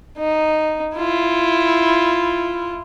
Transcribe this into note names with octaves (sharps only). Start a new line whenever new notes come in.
D#4
E4 F4